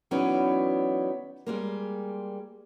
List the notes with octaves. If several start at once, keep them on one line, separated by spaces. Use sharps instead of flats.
E3 F#3 B3 C#4 D#4 D5
G3 G#3 A#3